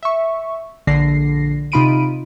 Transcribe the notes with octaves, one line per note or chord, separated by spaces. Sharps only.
E5 C#6
A#1 D3 D4 A#6 C7
C3 D#4 F4 B5 D7 D#7